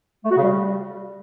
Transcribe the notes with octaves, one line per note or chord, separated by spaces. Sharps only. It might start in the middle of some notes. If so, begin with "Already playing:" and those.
A3
F#4
C#3
G3